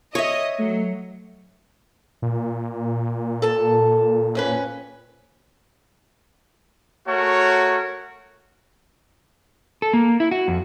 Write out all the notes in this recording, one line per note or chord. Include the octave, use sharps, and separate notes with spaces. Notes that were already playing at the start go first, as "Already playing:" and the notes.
C#5 D#5 E5
F#3 A3
A#2
A4 A5
F2 C#4 B4
A3 F#4 A#4 C#5
A4
A#3
E4
F#4
F2